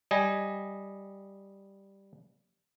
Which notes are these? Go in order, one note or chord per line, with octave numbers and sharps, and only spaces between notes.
G3 D#5 G#5